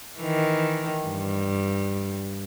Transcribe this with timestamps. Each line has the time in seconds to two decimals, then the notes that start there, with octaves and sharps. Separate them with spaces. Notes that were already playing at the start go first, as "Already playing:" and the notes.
0.18 D#3 E3
1.08 G2